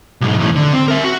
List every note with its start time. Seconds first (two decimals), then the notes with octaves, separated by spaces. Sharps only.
0.21 B1 G#2
0.39 E2 A2
0.56 D3
0.73 C4
0.88 A#4 E5
1.04 F#4